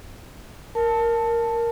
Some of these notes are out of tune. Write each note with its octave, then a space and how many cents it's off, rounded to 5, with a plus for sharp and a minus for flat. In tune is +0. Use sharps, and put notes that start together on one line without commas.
A#4 +0 A5 +0